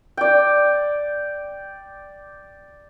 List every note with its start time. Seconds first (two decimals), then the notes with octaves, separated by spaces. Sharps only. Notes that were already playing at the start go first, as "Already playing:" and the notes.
0.17 D5 G5